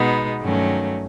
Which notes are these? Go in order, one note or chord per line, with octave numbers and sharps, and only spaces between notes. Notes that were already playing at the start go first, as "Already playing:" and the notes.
Already playing: B2 G#3 B3 D#4
G2 D#3 F#3 A3 C#4